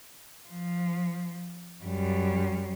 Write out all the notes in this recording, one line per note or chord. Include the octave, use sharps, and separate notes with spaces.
F3
F#2 G3